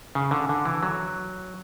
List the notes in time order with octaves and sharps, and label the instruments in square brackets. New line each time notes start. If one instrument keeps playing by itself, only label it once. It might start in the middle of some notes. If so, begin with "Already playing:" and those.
[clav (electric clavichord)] C#3
D3
D3
E3
F#3